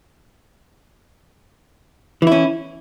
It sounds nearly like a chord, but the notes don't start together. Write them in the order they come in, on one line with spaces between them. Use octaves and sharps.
E3 E4 C#4